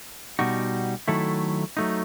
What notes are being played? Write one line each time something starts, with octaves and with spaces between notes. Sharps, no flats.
B2 G3 D#4 F#4
D#3 F#3 A3 E4 A4
F#3 A3 D#4